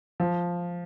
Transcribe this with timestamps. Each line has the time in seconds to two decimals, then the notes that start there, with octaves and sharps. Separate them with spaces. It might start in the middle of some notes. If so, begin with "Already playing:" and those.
0.20 F3